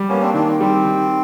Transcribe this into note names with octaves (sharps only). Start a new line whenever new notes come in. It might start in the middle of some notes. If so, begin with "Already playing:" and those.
Already playing: G3
A#3 B3 C#4
C4 D4
D#3 C4 D4
C4
G3 C4
D#3